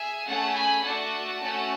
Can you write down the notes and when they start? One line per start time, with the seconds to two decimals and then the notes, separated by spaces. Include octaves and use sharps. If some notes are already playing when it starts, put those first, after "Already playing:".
Already playing: G#4 E5 G#5
0.27 A3 C#4 G#4 F#5 A5
0.55 G#5 B5
0.83 A3 D4 F#4 F#5 A5
1.41 A3 C#4 F#4 A4